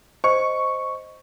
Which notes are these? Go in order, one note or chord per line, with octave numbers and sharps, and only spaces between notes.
C5 D#5 C#6 C#7